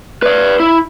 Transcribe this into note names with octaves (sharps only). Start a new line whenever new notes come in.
B4 D5
E4